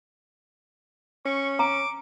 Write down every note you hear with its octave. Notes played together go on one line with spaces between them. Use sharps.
C#4 C#6
A#5 D6